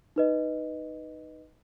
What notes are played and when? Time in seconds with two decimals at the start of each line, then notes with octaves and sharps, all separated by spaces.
0.16 D#4 B4 D#5